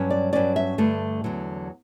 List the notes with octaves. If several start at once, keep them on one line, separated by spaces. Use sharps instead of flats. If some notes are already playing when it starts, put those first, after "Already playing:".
Already playing: G2 F#3 C#4
D5
G2 F#3 C#4 D5
E5
G2 D3 A3
E2 D3 F#3